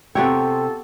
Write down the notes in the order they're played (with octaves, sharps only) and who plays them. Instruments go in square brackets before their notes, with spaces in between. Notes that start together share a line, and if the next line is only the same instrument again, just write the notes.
[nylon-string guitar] C3 F4 E5 [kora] B3 G4 C#5 [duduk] A4 [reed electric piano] G5